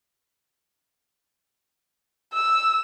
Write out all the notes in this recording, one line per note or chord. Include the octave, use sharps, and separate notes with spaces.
E6